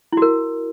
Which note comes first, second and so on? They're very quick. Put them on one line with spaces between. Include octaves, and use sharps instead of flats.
E4 F#4 A#4